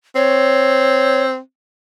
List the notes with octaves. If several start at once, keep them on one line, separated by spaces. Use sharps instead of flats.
C4 C#5